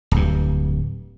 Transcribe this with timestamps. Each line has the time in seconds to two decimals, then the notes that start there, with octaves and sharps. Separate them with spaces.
0.11 D1 G2